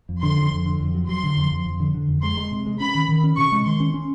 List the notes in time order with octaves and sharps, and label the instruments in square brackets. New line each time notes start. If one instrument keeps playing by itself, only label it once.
[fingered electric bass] F2
[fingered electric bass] D3 [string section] C6
[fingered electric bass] F2
F2
D3
F2
F#3
[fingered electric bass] F#3 [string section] C6
[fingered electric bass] D3
F2
F2
F2
D3
D3
F2
[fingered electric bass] G#3 [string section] C6
[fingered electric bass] G#3
C3
G#3
[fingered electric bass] C#4 [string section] B5
[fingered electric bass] D#3
D#3
C#4
[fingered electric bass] C3 [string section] C#6
[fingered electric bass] G#3
[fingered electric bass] D#3 [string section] C6
[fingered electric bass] C#4
C#4